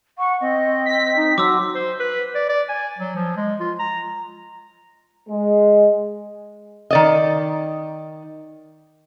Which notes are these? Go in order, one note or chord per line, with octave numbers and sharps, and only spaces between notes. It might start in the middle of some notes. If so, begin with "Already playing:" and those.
F#5 C#6
C4 D#5
B6
D#4
F#3 C6 D6 E6
C5
B4
D5
D5
G#5
F#3
F3
G#3
F4
A#5
G#3
D#3 D5 D#5